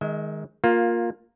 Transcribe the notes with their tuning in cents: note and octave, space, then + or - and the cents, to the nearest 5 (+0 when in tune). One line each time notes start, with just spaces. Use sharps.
D#3 +0 G#3 +0 E5 -40
A#3 +0 F4 +15